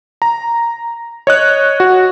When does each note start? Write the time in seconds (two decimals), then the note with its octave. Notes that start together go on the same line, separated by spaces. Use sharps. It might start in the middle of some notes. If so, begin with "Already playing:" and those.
0.22 A#5
1.27 C#5 D#5 F#6
1.80 F#4